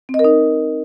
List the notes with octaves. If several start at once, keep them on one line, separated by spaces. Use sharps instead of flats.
C4
D#5
A#4
D#4